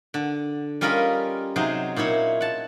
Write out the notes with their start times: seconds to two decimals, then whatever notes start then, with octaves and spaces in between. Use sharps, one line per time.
0.14 D3
0.81 G3 C#4 F4 A#4 D#5 B5
1.56 C3 F#3 D#4 G#4 C5
1.96 A#2 D#4 E4 C#5
2.41 F#5 A5